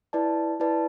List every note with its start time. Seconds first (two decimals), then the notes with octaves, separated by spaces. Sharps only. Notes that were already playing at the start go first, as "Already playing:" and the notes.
0.13 E4 B4 D5 A5
0.60 E4 B4 D5 A5